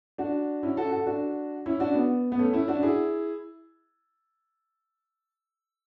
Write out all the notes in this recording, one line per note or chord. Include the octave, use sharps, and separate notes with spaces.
D4 F#4
C#4 E4
F#4 A4
F#4 A4
D4 F#4
C#4 E4
D4 F#4
B3
B3
A3 C#4
C#4 E4
D4 F#4
E4 G#4